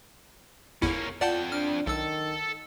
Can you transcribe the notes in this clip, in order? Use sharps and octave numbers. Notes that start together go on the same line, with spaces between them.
G1 E2 A#3 C#4 E4
F2 F4 D5 F#5 G5 A5
D4 F6
B1 D#3 A4 E6